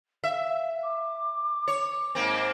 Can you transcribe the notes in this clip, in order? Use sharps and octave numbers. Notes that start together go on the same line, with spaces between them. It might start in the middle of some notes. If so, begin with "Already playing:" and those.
E5 F5
D6
C#5
G#2 A#3 C4